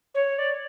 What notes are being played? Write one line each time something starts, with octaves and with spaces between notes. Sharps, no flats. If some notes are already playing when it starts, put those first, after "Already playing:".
C#5
D5